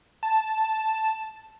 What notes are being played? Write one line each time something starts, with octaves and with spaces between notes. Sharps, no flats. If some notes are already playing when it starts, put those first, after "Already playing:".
A5